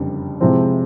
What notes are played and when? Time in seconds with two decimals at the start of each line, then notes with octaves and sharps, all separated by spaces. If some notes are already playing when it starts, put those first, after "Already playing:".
Already playing: F#1 F2 D3 G3
0.40 C3 F3 G#3 C4 E4